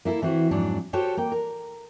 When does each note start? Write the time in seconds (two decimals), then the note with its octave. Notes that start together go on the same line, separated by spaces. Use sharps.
0.05 A#3 E4 G4 A4
0.22 E3 C4 E4 F#4
0.51 F2 G#2 F#3 D4
0.93 F#4 G4 A4 C5 C#5 G5
1.17 A#3 G5
1.32 A#4